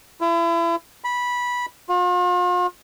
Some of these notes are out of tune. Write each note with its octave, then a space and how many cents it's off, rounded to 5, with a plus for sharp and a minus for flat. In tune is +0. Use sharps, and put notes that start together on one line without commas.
E4 +35
B5 -15
F4 +40